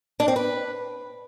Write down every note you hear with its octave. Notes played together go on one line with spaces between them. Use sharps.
D4
C4
B4